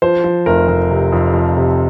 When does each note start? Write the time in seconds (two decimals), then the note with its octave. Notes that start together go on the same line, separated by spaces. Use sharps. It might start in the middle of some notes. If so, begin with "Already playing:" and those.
0.02 F3 C5
0.24 F3
0.46 F1 A#4
0.68 F1
0.91 C3
1.12 F2
1.33 F3
1.57 C3